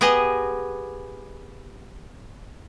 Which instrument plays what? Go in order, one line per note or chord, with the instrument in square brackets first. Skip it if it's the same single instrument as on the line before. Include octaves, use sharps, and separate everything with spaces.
[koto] B3 G4 G#4 D#5